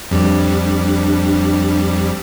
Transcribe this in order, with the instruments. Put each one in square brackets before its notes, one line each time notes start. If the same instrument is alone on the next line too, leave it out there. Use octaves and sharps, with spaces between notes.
[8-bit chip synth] F2 G3 [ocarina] D4